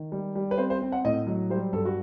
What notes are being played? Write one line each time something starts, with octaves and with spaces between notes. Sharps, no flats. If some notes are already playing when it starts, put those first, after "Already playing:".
Already playing: D#3
G3
G3
B4
C4 C5
C5
C4
F#5
A2 D#5
F#3
G3 C5
G2 A4
F#4